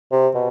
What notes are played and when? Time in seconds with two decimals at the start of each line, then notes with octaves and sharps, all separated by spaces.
0.12 C3
0.35 B2